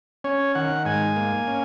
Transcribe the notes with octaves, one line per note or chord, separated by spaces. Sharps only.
C#4 C#5
D#3 F#5
G#2 G#5
A#3
C#4